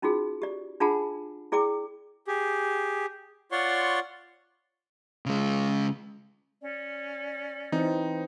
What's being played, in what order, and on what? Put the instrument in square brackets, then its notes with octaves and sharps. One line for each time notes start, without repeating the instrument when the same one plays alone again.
[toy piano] C#4 D#4 F4 F#4 G#4
G4 D5
D4 F4 G#4 F#5 A5 B5
E4 G#4 D5 G5 D6
[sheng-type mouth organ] G4 G#4
F4 C#5 D5 F#5 C6 C#6
[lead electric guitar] C#3 G#3
[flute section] C#4 D5
[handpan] E3 C4 [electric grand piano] D#4